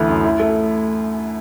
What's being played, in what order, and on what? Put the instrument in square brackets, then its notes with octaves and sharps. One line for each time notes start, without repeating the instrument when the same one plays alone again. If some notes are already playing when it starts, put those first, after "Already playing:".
Already playing: [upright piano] D2 E3 A3
F#2
E4
A3